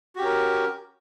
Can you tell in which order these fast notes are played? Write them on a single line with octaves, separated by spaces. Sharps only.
F#4 G4 C#4 A#4